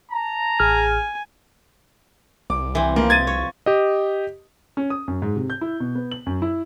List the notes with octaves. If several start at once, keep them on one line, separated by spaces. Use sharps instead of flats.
A5 A#5
A1 G#4 G#5 F6
C2 D6
E3 C4
F3 A#3
G#6 A6 D#7
C#5
G4 D#5
C#4
D#6
F#2
G#2
C3
G6
E4
B2
B3
F#7
F#2
E4